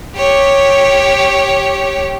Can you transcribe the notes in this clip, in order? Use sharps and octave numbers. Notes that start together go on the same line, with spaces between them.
G4 C#5